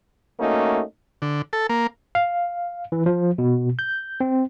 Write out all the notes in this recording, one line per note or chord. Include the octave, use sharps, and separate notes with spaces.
A3 A#3 C#4 D#4 F#4
D3
A4
A#3
F5
E3
F3
B2
G6
C4